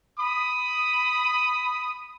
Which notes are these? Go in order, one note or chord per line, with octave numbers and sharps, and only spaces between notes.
B5 D#6